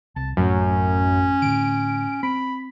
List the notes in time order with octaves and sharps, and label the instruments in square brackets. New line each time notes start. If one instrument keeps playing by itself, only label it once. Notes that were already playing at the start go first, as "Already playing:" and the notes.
[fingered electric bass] C2 [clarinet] A5
[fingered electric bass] A1 A2 [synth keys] F#2 [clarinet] C#4
[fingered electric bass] A2 D3 [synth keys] D7
[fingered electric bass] C4 [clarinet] B5